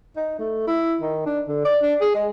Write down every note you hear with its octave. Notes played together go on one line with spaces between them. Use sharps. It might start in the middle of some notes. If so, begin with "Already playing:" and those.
D#4
A3
E4
D#3
D4
D3
D5
D4
G#4
G#3